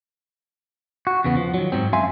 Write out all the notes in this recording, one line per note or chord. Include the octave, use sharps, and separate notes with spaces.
F#4
E2 C#3 B3
F3
D#3 F#3
G#2 F#3 C4
F#2 E5 F5 G#5 C6